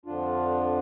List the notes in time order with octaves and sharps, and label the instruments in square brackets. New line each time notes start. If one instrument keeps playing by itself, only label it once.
[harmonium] F2 D3 F3 D4 F4